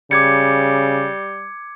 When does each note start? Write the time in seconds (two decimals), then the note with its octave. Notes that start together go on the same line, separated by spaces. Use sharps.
0.11 C#3 G3 D6 G#6 C#7